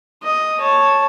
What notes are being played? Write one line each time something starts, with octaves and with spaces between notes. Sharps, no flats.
D#5
C#5 A5